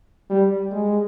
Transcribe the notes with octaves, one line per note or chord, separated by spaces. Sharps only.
G3
G#3